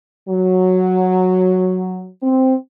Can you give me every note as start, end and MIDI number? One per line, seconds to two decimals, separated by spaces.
0.29 2.08 54
2.22 2.55 60